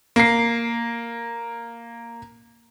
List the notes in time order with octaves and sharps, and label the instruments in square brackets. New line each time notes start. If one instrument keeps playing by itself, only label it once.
[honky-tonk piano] A#3 C7